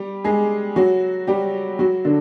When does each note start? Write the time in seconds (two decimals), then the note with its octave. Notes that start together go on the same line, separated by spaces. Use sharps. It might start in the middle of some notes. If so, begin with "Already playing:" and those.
Already playing: G3 G4
0.24 G#3 G#4
0.76 F#3 F#4
1.27 G3 G4
1.79 F#3 F#4
2.05 D3 D4